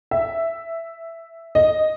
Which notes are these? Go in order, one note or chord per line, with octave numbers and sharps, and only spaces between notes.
E5
D#5